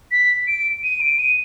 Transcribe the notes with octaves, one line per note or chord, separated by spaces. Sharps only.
B6
D7
D#7
D7
D#7